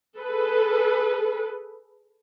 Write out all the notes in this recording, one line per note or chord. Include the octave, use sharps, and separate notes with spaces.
G#4 A4 B4